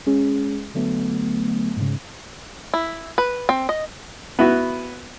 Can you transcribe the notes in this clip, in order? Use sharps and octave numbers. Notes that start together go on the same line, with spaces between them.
G#3 C#4 G#4
D3 F#3 A3 B3
G#2 C#3
E4
B4
C4
D#5
B3 E4 F#4